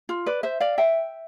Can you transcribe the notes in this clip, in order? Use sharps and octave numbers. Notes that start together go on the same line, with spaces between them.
F4
B4 D5
C5 E5
D5 F5
E5 G5